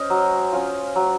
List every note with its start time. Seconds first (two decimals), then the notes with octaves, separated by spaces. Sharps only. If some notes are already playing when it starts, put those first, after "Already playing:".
Already playing: C#4 C5 D#5
0.10 F#3
0.53 C#4 F4
0.96 F#3